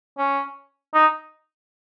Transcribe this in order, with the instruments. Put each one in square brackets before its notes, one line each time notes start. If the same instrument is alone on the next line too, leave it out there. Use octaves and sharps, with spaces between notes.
[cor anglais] C#4
D#4